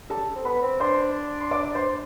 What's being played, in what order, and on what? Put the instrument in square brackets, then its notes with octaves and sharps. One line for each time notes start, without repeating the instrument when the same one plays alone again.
[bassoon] G3 [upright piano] A4 A5
[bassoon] C4
[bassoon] B3 [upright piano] B4 B5
[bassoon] C4
[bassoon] D4 [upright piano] C5 C6
[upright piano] C6
D5 D6
D6
C5 C6